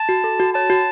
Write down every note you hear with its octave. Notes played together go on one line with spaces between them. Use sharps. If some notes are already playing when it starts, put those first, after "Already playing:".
Already playing: A5
F#4
A4
F#4
C#5 A5
F#4